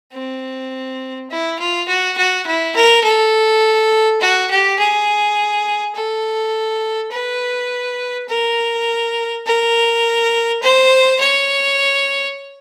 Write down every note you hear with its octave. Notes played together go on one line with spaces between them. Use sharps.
C4
E4
F4
F#4
F#4
E4
A#4
A4
F#4
G4
G#4
A4
B4
A#4
A#4
C5
C#5